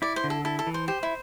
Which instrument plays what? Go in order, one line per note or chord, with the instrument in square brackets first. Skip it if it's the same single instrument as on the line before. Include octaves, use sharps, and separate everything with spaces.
[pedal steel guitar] E4 [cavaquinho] D5
[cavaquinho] C5
[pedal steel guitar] D3
[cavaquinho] A4
[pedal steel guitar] E4 [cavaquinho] A4
[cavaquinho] A4
[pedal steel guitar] E3
[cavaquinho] C5
[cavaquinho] G4 [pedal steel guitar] C5
[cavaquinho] E4